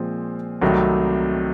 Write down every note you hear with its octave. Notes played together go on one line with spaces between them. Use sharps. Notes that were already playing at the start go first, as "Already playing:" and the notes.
Already playing: A#2 F3 G#3 C4
C2 C3 D#3 F#3 A3